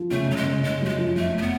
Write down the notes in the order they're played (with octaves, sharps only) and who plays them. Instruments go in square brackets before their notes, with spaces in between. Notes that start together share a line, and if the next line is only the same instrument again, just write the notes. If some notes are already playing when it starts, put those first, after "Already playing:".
Already playing: [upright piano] F3
[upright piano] C#3 [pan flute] A3
[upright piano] C#3 [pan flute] F#3
[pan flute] G#3
[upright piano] C#3
[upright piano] C#3 [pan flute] G#3
[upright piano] F#2 [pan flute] A3
[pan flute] G#3
[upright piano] F3
[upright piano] F1 [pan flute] A3
[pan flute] A3
B3